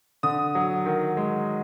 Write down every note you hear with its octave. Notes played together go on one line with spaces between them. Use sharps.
D3 D#6
F#3
D#3
G#3